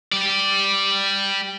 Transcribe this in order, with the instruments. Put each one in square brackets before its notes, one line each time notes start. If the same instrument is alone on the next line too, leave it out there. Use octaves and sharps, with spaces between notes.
[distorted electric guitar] G4 D5